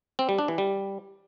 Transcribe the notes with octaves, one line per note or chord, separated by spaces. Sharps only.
C4
G3
D4
E3
G3